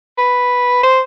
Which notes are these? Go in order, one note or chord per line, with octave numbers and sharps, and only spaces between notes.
B4
C5